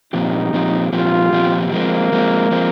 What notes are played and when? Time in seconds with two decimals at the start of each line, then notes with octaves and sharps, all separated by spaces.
0.13 A#2 F3 C4 D#4 G4
0.53 A#2 F3 C4 G4
0.92 A#2 F3 C4 F4 G4
1.32 A#2 F3 C4 G4
1.72 F3 G#3 A#3 C4
2.12 F3 G#3 C4
2.51 F3 G#3 C4